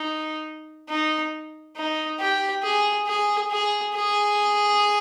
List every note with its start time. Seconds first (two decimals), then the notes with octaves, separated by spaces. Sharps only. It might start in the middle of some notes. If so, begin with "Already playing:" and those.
Already playing: D#4
0.89 D#4
1.77 D#4
2.20 G4
2.64 G#4
3.08 G#4
3.52 G#4
3.96 G#4